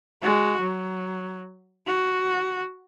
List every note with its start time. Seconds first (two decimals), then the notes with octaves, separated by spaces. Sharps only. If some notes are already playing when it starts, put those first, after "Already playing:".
0.22 G#3 F#4
0.61 F#3
1.87 F#4